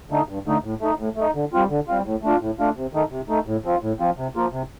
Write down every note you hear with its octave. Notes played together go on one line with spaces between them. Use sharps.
D3 A3 D#4
G2
D3 A3 D#4
A2
A3 D#4
A2
A3 D#4
D3
G3 C4 F4
D3
G3 C4 F4
A2
A3 D4 F4
A2
A3 D4 F4
C3
D#3 A3 D#4
C3
D#3 A3 D#4
A2
F3 C4 F4
A2
F3 C4 F4
C3
F3 A#3 F4
C3